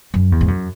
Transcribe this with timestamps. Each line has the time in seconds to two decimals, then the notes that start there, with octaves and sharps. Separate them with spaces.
0.14 F#2
0.32 E2
0.41 G#2
0.48 F#2